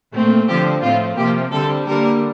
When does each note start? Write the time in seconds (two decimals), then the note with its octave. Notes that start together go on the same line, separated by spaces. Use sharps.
0.12 A#2 A3 C4
0.48 D3 F3 C4 G4
0.82 A2 F3 A3 C4 F4
1.17 C3 F3 A#3 G4
1.52 D3 G3 C4 A4
1.86 D3 G3 A#3 A#4